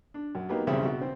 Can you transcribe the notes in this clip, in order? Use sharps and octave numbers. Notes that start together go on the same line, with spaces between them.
D4
F#2
F#3 A#3 B3 D#4 G4
B1 E2 G2 C#3 C4 E5
B2
C4